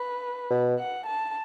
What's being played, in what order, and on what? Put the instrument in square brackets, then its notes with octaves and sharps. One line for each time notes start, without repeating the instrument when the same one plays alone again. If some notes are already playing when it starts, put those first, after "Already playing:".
Already playing: [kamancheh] B4
[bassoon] B2
[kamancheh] F#5
A5